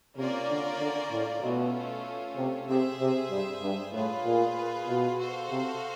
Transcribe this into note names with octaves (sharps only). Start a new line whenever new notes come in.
C3 A#3 C#4 F4 A#4 D5
D3
D3
A2
B2 A3 C#4 F4
C3
C3 G#4 C5 E5
C3
G2
G2
A2 F4 G#4 B4
A#2
B2
F#4 A4 C5 F5
C3